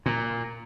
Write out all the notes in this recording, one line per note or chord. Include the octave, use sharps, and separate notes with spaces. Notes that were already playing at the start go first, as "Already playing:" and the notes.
A#2